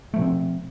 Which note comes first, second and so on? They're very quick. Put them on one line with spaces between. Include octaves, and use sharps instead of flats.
A3 F3 B2 C4